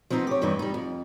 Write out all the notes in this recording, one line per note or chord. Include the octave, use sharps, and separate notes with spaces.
F3 B3 C4 D4 D#4
G4 C#5
E2 G2 E3 D#4
G3 D#4
F2